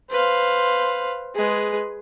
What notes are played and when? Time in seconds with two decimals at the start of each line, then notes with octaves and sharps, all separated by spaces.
0.11 B4 C5 F5
1.36 G#3 G#4 B4